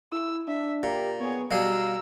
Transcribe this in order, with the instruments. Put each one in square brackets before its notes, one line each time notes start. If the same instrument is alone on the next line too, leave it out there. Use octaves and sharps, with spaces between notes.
[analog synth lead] E4 [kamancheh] E6
[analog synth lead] D4 [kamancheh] E5
[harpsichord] A#2 [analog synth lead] G4 [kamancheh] A#4
[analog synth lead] B3 [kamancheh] G#4 C#5
[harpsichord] B2 G3 G#4 [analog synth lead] F5 [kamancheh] A#5 E6